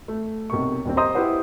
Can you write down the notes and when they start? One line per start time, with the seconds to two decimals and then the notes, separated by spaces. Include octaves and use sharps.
0.08 A3
0.50 B1 C3 A#4 C#6
0.85 D#1 D#2 C4
0.97 G4 C5 D#5 A#5 C6 D#6
1.15 E4 G4 B4 C5 F#5